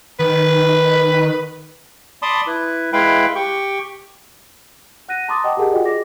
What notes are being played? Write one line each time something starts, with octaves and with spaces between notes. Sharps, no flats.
D#3 B4
D5 A5 B5 C6 D6 D#6
E4 B4
G#3 E4 B4 F5 G5 B5
G4 G5 C#6
F#5 F#6 A#6 D#7
A5 A#5 C6 D6 D#6 A6
D#5 F#5 G5 A5 D#6
G4 G#4 A#4 F#5 G#5
F4 F#4 D5 D#5 F#5 G5
G#4 D6 A#6